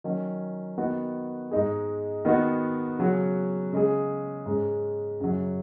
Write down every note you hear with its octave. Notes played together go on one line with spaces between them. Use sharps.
D#3 F#3 C#4
D#3 B3 F#4
G#2 G#3 D#4 G#4
D#3 B3 D#4 F#4
C#3 F#3 C#4 F#4
C#3 G#3 C#4 G#4
G#2 G#3 C#4
F#2 C#3 F#3